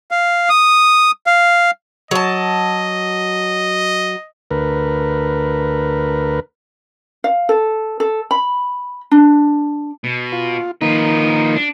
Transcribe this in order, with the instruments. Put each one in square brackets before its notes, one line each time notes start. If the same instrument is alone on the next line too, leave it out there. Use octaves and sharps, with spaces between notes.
[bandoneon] F5
D#6
F5
[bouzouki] F#3 A5 [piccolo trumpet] D#5
[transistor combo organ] D2 A#4 B4
[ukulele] F5
A4
A4
B5
D4
[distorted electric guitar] B2
[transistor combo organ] F4
[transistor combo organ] D#3 A#3 D#4 [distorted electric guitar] F3 B4
[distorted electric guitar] D4